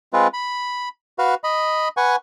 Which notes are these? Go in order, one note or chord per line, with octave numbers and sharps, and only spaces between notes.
G#3 C4 F4 B4
B5
F#4 B4 F5
D#5 B5
B4 F#5 G#5 C#6